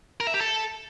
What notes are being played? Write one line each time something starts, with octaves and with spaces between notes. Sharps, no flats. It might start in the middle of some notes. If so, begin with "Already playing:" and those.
A#4
E5
G4
A4